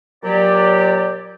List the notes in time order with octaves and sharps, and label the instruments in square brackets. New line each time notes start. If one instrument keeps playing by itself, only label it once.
[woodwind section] A#2 F#3 G4 D5